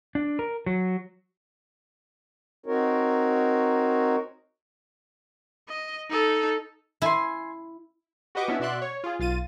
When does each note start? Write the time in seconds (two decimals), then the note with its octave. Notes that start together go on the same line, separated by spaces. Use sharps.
0.15 D4
0.39 A#4
0.66 F#3
2.66 C4 D#4 F#4 A#4 C#5
5.69 D#5
6.10 D#4 A4
7.02 E4 G#5 A5 C6
8.35 F#4 G4 B4 D#5 C#6 D6
8.48 B3 C#4 D4 E4
8.60 B2 F#4 D5 E5 C6 F#6
8.82 C#5
9.04 F4 G#4
9.19 B1 F4 A6 D#7